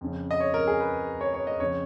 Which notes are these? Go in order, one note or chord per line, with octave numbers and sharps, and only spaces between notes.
F2 C#3
D#5
C#5
A#4
G#4
B4
C#5
C#5
D#5
F2 C#3 C#5